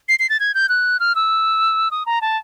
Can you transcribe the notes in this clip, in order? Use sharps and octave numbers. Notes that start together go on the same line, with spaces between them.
C7
C7
A6
G#6
G6
F#6
F6
E6
D#6
A#5
A5